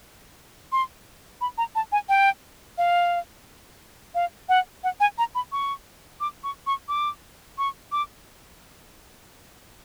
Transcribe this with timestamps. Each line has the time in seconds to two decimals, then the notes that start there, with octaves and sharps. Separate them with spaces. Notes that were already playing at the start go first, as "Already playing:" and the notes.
0.72 C6
1.41 B5
1.58 A#5
1.75 A5
1.92 G#5
2.09 G5
2.78 F5
4.15 F5
4.49 F#5
4.84 F#5
5.00 G#5
5.18 A#5
5.35 B5
5.52 C#6
6.20 D6
6.44 C#6
6.67 C#6
6.88 D6
7.58 C#6
7.92 D6